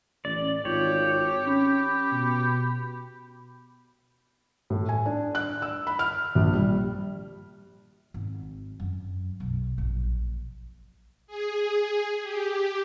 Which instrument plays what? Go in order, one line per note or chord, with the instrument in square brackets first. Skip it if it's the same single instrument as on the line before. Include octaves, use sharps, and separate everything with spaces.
[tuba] A1 [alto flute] C#4 [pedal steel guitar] D5
[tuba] G#1 [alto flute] F4 [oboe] G4 [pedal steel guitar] C#5
[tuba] C#4 [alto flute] B5
[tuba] B2
[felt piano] A2
G#5
D4
F#6
E6
B5
F6
A#1
G3
[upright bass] G#1
F#2
B1
A#1
[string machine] G#4
G4